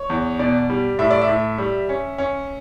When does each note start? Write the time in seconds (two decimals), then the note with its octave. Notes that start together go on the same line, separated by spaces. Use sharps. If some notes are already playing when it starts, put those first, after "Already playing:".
Already playing: C#5
0.10 E2
0.39 B2 D5
0.70 G3
0.99 A2 E5
1.11 D5
1.22 E5
1.29 A2
1.58 G3
1.89 C#4
2.18 C#4